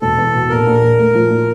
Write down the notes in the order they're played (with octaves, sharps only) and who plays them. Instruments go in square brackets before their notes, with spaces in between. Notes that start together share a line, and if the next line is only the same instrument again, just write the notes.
[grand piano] E1 [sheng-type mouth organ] A4
[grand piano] E2
B2
[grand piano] A#1 [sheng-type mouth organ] A#4
[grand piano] A#1
A#1
A3
F3
A#2